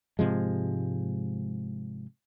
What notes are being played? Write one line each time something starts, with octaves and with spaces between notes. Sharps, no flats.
G#2 C3 F3 G#3